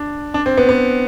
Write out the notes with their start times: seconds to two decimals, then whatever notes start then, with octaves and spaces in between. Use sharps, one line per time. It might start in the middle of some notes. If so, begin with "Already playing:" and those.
Already playing: D4
0.34 D4
0.46 C4
0.58 B3
0.69 B3